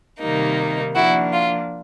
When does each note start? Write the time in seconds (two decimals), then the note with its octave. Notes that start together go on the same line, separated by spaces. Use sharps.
0.20 C3 D#3 G3 A#3 D#4
0.95 F3 A#3 D4 E4 F#4
1.33 F4